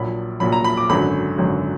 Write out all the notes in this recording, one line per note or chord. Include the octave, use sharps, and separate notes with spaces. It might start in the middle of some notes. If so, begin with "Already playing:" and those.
Already playing: A#1 A#2 F#3 B5
A#1 A#2 F#3 B5
A#5
B5
D6
G#1 F#2 D3 F#3 B5
G#1 F#2 D3 F#3